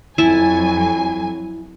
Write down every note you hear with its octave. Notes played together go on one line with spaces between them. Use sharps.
F2 F#3 E4 G#5 A5